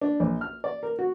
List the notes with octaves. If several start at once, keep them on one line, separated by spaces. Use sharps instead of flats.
D4
A#1
F6
D5
A#4
F#4